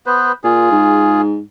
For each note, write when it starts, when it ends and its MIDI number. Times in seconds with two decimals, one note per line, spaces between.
0.06 0.32 59
0.06 0.32 71
0.06 0.32 72
0.44 0.69 46
0.44 1.21 65
0.44 1.21 68
0.71 1.40 44